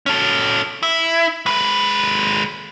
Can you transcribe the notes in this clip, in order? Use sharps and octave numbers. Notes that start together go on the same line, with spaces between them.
C#4 A4
E4
G#3 B4